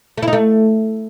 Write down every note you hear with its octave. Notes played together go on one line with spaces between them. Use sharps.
A3
E4
D#4
A3